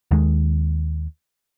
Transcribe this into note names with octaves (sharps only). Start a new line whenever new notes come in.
D#2 D#3 G#3